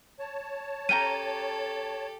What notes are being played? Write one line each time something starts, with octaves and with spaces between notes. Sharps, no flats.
C#5 A5
C#4 G4 A4 G5 A#5 D#7